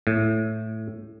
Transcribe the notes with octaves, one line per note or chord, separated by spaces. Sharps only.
A2